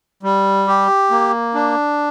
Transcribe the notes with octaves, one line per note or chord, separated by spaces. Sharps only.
G3
G4
A#3
D4